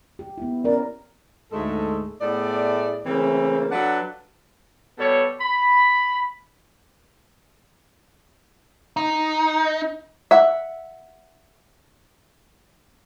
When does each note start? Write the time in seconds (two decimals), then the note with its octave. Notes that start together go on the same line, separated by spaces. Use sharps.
0.19 G4
0.38 B3 E4
0.64 C#4 A#4 D5
1.52 D2 G#2 G#3 A3 A4
2.20 A2 A3 B3 G#4 D5
3.05 C#3 E3 A3 A#3 C4
3.71 F#3 D4 A4 B4 F5 F#5
4.98 B2 G3 A4 C#5
5.40 B5
8.97 D#4
10.31 E5 F#5